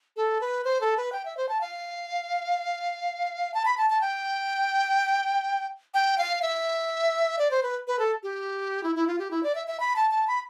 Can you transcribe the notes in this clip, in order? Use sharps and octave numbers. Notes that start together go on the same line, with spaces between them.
A4
B4
C5
A4
B4
G5
E5
C5
A5
F5
A5
B5
A5
A5
G5
G5
F5
E5
D5
C5
B4
B4
A4
G4
E4
E4
F4
G4
E4
D5
E5
E5
B5
A5
A5
B5